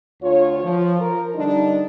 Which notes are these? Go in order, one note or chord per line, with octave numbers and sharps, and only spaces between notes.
D2 F4 C#5
F3
A#4
D3 G3 D4 D#4